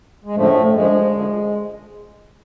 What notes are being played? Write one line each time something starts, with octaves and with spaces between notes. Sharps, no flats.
G#3
F#2 A2 D3 F3 A3
F#2 D3 F3 G#3
F#2 D3 F3